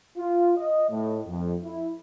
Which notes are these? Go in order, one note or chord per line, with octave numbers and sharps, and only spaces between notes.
F4
D#5
A2
F2
E4